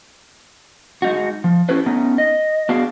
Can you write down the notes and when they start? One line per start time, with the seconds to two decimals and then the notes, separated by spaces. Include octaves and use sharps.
1.02 G#3 D#4 F#4
1.44 F3
1.69 C#4 E4 G4 A4 B4 C5
1.86 A3 B3 C#4 D#4
2.18 D#5
2.69 B3 D4 F#4 G#4 F5